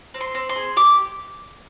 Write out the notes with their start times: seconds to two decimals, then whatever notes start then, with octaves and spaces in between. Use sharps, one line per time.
0.14 C4
0.21 C6
0.35 C4
0.49 C6
0.56 G#4
0.76 G4 D6